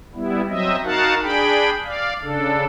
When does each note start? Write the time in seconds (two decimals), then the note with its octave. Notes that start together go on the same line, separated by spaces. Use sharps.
0.15 G3 B3 E4
0.49 F#3 C4 D#5 E5
0.84 D#4 F#4 A#4 F5 F#5 A5
1.23 D4 G#4 G5 B5
1.84 D5 F5
2.22 C#3 D4 A4